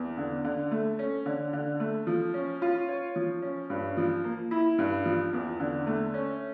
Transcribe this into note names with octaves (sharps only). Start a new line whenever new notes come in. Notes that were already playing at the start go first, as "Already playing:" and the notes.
Already playing: E2
D3
D3
A3
C#4
D3
D3
A3
F3
C#4
F4
C#5
F3
C#4
G2
F3
A#3
E4
G2
F3
E2
D3
A3
C#4